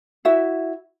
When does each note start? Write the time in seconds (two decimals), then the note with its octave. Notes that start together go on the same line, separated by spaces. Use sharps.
0.25 E4 F#4 E5